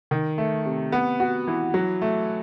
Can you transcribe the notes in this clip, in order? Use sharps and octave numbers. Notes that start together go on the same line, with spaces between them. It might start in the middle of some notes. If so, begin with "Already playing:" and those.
D#3
A3
C3
B3
F#4
E3
F#3
A3